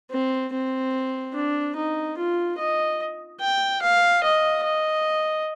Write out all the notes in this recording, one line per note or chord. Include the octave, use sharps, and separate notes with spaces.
C4
C4
D4
D#4
F4
D#5
G5
F5
D#5
D#5